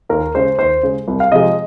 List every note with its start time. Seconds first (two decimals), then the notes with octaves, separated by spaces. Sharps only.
0.09 D#2 A#4
0.35 C#3 G#3 C5
0.58 D#2 C5
0.83 C#3 G#3
1.08 C2
1.20 F5
1.32 C3 F3 G#3 D#5